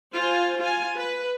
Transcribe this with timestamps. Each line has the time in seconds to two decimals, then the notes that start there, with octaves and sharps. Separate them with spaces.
0.14 F4 C5 G#5
0.58 F4 G#5
0.95 B4